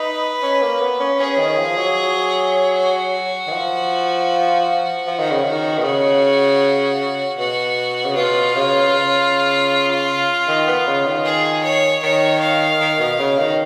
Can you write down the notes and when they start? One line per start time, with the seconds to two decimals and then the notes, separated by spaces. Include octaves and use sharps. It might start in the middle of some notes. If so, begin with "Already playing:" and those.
Already playing: D#4 B4
0.42 C#4
0.62 A#3
0.81 B3
1.00 C#4
1.19 C#4 G#4
1.39 D#3
1.58 F3
1.78 F#3
2.74 F#4
3.48 D#3
3.52 F3
5.07 F3
5.19 D#3
5.31 C#3
5.44 D#3
5.78 B2
5.84 C#3 F#4
7.38 B2 F#4
8.05 C#3
8.16 B2 F4
8.55 C#3
8.93 C#3
10.48 D#3
10.67 B3
10.87 C#3
11.06 D#3
11.25 G#4
11.64 C#5
12.03 D#3 C#5
12.42 F5
12.80 D#3
12.99 B2
13.19 C#3
13.38 D#3